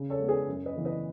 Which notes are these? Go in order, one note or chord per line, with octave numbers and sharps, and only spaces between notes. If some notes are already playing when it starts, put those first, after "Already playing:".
Already playing: C#3
A4 C#5
G#3 B3
G#4 B4
F#2
B4 D#5
C#3 E3 B3
B4 D#5